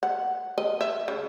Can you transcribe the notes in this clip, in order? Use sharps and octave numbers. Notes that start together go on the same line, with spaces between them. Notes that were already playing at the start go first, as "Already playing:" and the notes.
F#5
D#5
E5
C#3